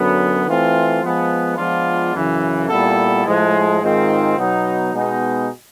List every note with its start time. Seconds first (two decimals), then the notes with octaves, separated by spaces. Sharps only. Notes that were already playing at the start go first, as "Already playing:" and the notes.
Already playing: F#2 D3 F#3 B3
0.46 E3 A3 C4 F4
1.02 F3 G#3 B3
1.57 F3 G#3 B3 D4 F4
2.13 F#2 C#3 E3
2.69 A#2 G3 B3 E4 A4
3.25 A2 F3 G#3
3.80 G#2 D#3 G#3 C4 F4
4.36 B2 F#3 B3 D#4
4.92 B2 G#3 B3 D#4